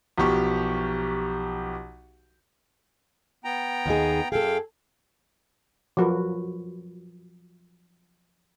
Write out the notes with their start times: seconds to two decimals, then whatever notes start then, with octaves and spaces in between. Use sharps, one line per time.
0.18 B1 F3 G4 C#6
3.45 B3 G5 A#5
3.86 D#2 D#4 G#4
4.32 F#2 G#4 A4 F5 G5
5.97 F3 F#3 F#4 A#4 B4